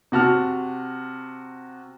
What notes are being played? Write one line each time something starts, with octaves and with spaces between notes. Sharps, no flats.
C3 F#4 A5 F6